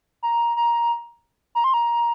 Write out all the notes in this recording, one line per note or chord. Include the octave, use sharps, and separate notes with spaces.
A#5
A#5
A#5
C6
A#5